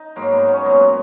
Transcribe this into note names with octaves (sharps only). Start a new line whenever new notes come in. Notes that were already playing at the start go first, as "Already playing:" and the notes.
Already playing: D#4
G#2 F#3 A#3
B3
C#4
A#2 F#3 B3